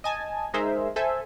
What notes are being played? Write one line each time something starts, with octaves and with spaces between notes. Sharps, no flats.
D#5 G#5 A5
G#3 D#4 G#4 A#4 C5 E5
A4 C5 E5 G#5